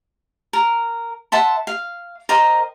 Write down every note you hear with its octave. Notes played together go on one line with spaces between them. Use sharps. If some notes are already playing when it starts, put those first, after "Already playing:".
A#4
E5 F#5 A5 C6
F5
A#4 C5 D#5 G5